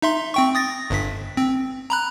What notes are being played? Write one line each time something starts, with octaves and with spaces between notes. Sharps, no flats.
D#4 E5 C6
C4 G5 C#6
D#6 A6 A#6
G1 G2 B6
C4
A#5 B5 F#6